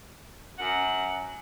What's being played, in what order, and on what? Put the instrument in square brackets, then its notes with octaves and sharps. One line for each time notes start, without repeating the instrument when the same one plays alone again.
[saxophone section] F#2 F#5